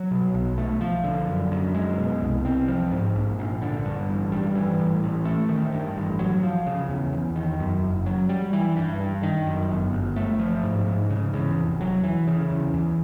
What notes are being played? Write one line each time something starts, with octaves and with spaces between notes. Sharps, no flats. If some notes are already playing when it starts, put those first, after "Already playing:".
Already playing: F#3
B2
B1
A3
F3
D3
F#2
F#2
G#3
B2
C2
C4
F3
G#2
A#1
A#1
D3
G2
A1
G3
E3
A2
A1
A3
D#3
G2
A1
F#3
F3
C#3
E2
E2
D#3
F#2
F#1
F#3
G3
E3
G2
G2
D#3
F#2
G1
G1
A3
F3
G#2
G#2
C#3
E2
F1
F#3
E3
C#3
E2
E2